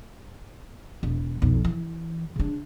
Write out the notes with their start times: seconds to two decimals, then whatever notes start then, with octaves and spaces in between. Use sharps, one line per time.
1.03 E1
1.42 B1 F2
1.65 E3
2.36 C#3 D4